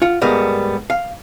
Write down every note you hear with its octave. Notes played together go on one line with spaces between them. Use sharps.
F4 F#5
G#2 G3 A#3 B3
F5